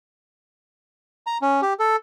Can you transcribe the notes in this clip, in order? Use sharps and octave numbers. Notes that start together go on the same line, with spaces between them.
A#5
C#4
G4
A4